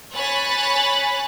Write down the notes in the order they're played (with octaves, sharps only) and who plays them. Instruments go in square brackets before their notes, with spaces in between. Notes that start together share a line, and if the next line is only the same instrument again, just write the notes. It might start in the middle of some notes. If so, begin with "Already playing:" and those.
[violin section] C#5 G#5 B5 F#6 A6